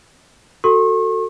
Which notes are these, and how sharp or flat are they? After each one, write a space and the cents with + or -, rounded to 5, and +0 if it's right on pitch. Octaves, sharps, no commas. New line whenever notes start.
F#4 +5 A4 +25 C#6 -40